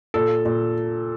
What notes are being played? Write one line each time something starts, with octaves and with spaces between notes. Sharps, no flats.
A#2 A4
A#2